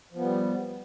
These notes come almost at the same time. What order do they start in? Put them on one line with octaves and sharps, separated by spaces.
F3 B3 G3